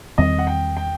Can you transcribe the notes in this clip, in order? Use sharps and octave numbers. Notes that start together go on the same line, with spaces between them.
E2 D#3 G3 C4 D#5
F#5
G5
G5